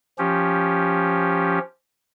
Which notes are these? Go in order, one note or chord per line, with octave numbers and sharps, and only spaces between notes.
F3 C#4 G4